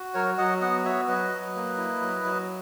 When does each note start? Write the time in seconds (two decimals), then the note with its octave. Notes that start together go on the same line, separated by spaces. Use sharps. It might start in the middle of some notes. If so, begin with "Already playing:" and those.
Already playing: F#4
0.14 F#3 A#4 C#5
0.38 F#3 D#5 F#5
0.61 B3 D#5 F#5
0.85 F#4 C#5 E5
1.07 F#3 B4 D#5
1.32 F#3
1.55 A#3
1.77 E4
2.01 F#3
2.24 F#3